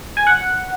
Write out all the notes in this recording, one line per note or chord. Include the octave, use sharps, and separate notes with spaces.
G#5
F#5